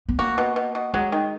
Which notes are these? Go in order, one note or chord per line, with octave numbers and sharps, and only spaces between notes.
B3
A#3 F#4
B2
B2
B2
F#3 G#3
D#3